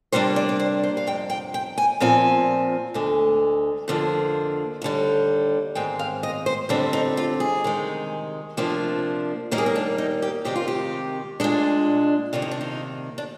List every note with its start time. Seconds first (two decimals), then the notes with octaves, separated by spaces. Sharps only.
0.12 C3 G3 A#3 D4 C5
0.36 D5
0.49 D5
0.59 C5
0.84 C5
0.97 F5
1.07 F2 C3 G5
1.30 G5
1.54 G5
1.78 G#5
2.00 A#2 F3 C4 G#5
2.94 D2 D3 G#3
3.88 F2 D3 F3 A#3
4.82 D#2 D3 G3
5.75 G#2 D#3 G#3 C4 G5
5.99 F5
6.23 D#5
6.46 C5
6.69 F2 D3 G3 C4 D4
6.93 D#4
7.17 F4
7.40 G#4
7.64 C3 D#3 G#3
8.57 C3 F3 A#3 D4
9.51 D#2 D#3 G3 A#3 A#4
9.58 G#4
9.66 A#4
9.75 D4
9.98 D#4
10.22 G4
10.45 C3 D#3 G#3 C4 G4
10.55 F4
10.68 G4
11.40 A#2 G#3 D4
12.33 C3 D#3 A#3 D4 F4
12.42 D#4
12.51 D4
12.61 D#4
13.18 D4